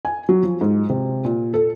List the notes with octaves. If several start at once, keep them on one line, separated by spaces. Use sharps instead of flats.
G#5
F#3
F3
G#2
C3
A#2
A4